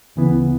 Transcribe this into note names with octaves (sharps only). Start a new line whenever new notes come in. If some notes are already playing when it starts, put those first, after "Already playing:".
D2 C#3 E3 B3 E4